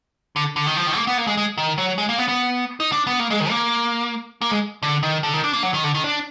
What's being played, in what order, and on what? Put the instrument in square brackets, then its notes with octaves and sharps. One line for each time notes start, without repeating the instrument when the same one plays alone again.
[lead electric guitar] D3
D3
D#3
F3
D#3
A#3
B3
A#3
G#3
G#3
D#3
F#3
G#3
A#3
B3
B3
D#4
D4
B3
A#3
G#3
D#3
A#3
A#3
G#3
D3
D#3
D3
D#3
D4
A#3
F#3
D#3
D3
D#3
D4